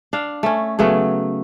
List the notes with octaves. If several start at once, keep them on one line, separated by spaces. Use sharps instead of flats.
D4 F5
A3 C#4
C#3 F#3 A3 B3